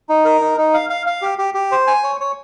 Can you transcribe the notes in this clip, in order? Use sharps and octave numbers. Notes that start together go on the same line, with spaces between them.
D#4
A#4
D#4
D#4
F5
F5
F5
G4
G4
G4
C5
G#5
C#5
C#5